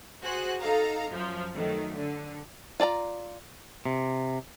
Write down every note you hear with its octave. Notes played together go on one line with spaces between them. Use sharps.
F#4 G#4 C5 F#6
D#4 A4 F5 A#5
F#2 F3
D#3 F#3 A3
D3
F4 D5 A5 A#5
C3